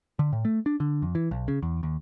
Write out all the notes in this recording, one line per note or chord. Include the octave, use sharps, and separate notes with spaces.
D3
A2
A3
D4
D3
F2
E3
B1
C#3
E2
D#2